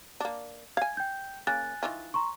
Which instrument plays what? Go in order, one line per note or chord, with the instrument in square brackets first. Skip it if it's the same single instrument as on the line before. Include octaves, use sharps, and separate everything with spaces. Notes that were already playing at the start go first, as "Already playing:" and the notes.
[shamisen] A#3 D4
[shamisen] F5 G#5 [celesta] G#6
[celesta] G5 G6
[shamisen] C#3 A#3 [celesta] G#5 F#6 A6
[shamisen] D#3 E3 F4
[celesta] A#5 C6 C#6